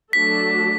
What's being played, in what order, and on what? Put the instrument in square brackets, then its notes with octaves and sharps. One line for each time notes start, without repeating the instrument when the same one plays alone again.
[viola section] F#3 A3 D4 F#4 A4 [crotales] B6